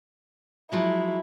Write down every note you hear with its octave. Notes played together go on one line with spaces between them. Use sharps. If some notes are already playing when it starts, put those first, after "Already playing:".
F3 F#3 G#3 E4